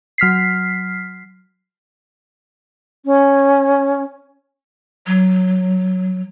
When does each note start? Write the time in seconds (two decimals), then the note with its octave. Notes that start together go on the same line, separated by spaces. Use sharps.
0.18 F#3 F6 B6 C7
3.05 C#4
5.07 F#3